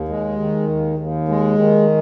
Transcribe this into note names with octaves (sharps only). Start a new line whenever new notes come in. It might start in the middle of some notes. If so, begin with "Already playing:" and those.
Already playing: D#2
G#3
D#3
D#2
D#2
G#3
D#3